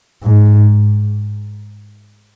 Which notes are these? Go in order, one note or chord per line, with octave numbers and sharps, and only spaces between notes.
G#2